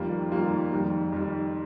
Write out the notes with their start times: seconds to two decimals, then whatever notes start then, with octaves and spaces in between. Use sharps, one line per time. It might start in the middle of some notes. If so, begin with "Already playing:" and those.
Already playing: F2 D#3 G3 A#3 F4
0.31 F2 D#3 G3 A#3 F4
0.72 F2 D#3 G3
1.12 F2 D#3 G3